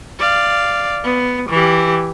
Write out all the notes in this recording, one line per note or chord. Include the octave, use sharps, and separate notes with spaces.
D5 F5
B3
E3 G4